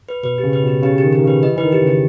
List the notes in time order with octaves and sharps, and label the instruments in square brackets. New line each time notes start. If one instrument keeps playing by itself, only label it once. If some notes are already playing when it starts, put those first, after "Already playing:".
[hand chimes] B4
[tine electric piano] B2 [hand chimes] B4
[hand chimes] G4
[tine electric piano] C#3
[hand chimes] B4
[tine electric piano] B2 [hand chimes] G4
[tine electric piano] C#3 [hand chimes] G4
[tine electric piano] D#3 [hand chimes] G4
[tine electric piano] D#3 [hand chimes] G4
[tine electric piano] C#3 [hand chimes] B4
[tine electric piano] E3 [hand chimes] D#5
[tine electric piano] E3 [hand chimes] B4
[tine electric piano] D#3
[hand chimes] G4
[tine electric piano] C#3
[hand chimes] G4